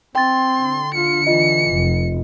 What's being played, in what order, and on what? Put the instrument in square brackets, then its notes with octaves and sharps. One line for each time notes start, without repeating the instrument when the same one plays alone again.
[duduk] C4 [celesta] G5 A6 [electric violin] C6
[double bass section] D3
[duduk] F4 [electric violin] C#7
[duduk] E3 [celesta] F4 D#5
[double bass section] F1